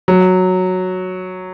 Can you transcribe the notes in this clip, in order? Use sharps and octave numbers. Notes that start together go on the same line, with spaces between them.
F#3